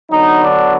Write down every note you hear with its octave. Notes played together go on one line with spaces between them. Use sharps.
D3 F#3 B3 D#4
D4